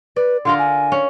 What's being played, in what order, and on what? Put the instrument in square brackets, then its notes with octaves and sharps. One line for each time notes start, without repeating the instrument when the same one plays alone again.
[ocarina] B4 [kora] D5
[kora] D3 F4 A#4 [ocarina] C6
[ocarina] G#5
[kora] C#4